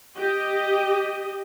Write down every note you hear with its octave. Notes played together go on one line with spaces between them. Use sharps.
G4 D#5